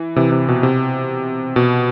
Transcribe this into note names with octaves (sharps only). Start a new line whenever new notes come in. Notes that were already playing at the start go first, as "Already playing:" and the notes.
Already playing: E3
C3 E3
C3
B2
C3
B2